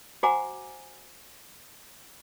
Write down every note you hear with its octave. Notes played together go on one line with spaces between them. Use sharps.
F#4 C5 F#5 G#5 A#5 D6